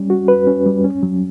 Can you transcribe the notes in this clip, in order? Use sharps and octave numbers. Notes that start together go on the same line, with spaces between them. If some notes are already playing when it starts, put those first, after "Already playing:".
Already playing: G3 C#4
F#4
B4
C#4
G3
C#4
F#3